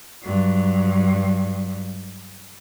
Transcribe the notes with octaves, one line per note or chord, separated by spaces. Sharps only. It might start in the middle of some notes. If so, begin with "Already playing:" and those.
G2 F#3